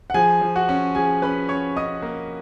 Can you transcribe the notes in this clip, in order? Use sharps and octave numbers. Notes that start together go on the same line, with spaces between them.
F#5
F3 G#4 G#5
F3
F#4 F#5
C#4
F3 G#4 G#5
C#4 B4 B5
C#4 C#5 C#6
C#4 D#5 D#6
A#3